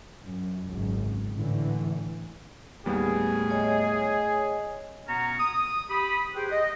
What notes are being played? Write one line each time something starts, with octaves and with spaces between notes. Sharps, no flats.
F#2
G#1 C#2 F#2
A2 D3 E3
D#2 A2 G3 B3 G#4
C#5 D#5 G#5
B2 B3 C#4 F#4 A#5
D#6
G4 B5 D#6
G4 G#4 B4 C5 G5
D#5